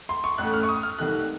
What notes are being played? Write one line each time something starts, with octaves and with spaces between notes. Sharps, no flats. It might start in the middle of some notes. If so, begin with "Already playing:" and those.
C6
C#6
A1 A2 A3 C#4 F#6
F6
C#6
D#6
F6
C2 C3 D#3 A3 F#6